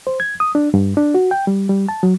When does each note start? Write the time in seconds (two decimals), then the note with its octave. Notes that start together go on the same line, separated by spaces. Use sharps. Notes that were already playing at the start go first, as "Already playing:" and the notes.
0.07 C5
0.20 G#6
0.40 D#6
0.55 D4
0.74 G2
0.97 D4
1.14 F#4
1.31 G5
1.47 G3
1.69 G3
1.89 A5
2.03 F#3